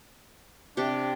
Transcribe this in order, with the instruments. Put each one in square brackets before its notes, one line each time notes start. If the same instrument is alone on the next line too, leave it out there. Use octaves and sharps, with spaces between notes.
[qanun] C3 G4 [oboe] D4